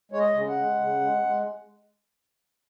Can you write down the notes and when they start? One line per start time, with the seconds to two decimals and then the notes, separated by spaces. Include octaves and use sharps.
0.12 G#3 C#5
0.19 D#5
0.34 C#3
0.49 F#5
0.57 G#3
0.79 C#3
1.01 G#3
1.23 G#3